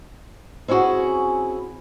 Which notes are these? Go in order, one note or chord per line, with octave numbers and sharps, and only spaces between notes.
C4 C#4 E4 F#4 G#4